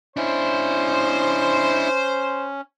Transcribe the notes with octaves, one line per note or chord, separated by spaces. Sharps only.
C#4 D4 E4 C5